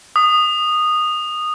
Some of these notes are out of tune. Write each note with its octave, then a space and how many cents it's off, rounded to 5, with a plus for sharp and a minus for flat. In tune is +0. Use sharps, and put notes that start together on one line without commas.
D#6 -15